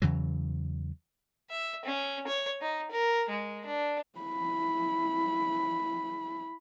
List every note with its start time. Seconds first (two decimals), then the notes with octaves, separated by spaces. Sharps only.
0.02 E2 C#3 E3 F#3
1.50 E5
1.85 C#4
2.27 C#5
2.61 D#4
2.91 A#4
3.29 G#3
3.65 D4
4.19 E4 B5